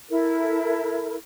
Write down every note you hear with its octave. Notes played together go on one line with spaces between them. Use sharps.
E4 A4 A#4